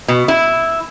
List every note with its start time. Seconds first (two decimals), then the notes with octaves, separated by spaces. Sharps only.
0.08 B2
0.28 E4